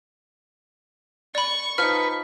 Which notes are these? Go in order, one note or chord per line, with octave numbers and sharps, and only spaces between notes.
D5 B5 C#6
F3 D#4 B4 F6